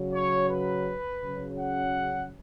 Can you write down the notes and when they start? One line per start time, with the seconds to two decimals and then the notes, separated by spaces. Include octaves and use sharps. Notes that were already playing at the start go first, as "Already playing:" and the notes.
Already playing: C#3 F#3
0.13 C#5
0.50 B4
1.22 C#3 F#3
1.59 F#5